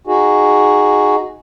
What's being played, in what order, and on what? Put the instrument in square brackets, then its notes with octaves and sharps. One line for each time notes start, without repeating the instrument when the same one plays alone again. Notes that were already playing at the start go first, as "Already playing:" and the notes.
[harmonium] D#4 F#4 G#4